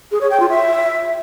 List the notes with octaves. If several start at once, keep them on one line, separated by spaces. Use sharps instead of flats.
G#4
C#5
G5
F4
E5